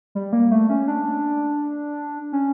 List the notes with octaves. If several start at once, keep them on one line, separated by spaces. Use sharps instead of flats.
G3
A#3
A3
C#4
D4
C#4